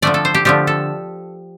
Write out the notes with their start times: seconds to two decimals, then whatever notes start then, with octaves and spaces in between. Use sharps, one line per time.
0.02 D3 F3 A3 D5
0.14 A4
0.25 C5
0.34 G4
0.45 D3 F3 A3 G4
0.67 A4